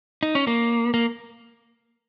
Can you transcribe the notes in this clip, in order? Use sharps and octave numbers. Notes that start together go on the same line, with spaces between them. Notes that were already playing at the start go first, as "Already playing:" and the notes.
D#4
C#4
A#3
A#3